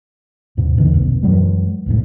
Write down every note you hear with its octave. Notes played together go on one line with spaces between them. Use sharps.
D#2 G#2 C3
D#2 D3 E3
F1 B1
F#2 E3 F#3 G#3
C2 F2 A2